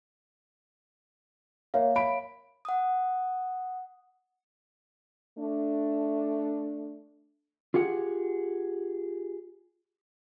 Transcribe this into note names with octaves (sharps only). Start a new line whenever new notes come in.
A#3 C#5 E5 F5
B5 D7
F#5 D#6
A3 D4
F4 G4 G#4 F#5